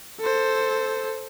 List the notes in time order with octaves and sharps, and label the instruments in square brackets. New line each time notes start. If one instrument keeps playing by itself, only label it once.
[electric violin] A4 C5